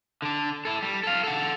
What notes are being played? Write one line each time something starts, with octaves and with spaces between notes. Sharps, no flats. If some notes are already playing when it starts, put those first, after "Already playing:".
D3 D4
E4 A4
G3
A4 F5
A4 F#5